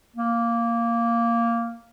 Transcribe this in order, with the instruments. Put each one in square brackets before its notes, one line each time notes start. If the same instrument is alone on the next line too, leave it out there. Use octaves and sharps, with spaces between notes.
[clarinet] A#3